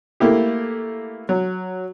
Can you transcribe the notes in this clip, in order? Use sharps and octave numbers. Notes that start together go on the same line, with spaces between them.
A3 A#3 E4 G4
F#3